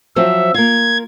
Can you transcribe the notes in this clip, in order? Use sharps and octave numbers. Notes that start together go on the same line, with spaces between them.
F3 F#3 C4 E5
A#3 F4 G#6